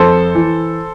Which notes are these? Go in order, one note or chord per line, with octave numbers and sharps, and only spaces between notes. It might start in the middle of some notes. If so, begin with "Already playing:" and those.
Already playing: F2 A4 C5
E3